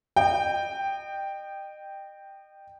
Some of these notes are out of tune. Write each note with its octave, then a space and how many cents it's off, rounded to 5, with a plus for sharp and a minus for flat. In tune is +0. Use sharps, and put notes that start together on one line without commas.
D#5 -30 G5 +0